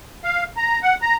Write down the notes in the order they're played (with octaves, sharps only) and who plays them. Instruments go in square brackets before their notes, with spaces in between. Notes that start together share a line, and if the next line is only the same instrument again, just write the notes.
[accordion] F5
A#5
F#5
A#5